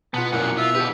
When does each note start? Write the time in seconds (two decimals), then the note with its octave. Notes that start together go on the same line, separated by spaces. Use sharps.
0.14 B2 B3 F4 F#5 A5
0.32 F#2 A#2 A#3 E4 A#4 F#5
0.58 F4 E5
0.75 D3 E4 G4 B4